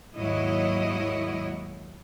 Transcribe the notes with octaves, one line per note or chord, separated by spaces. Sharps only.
D#2 G#2 F#3 E4 C#5 D#5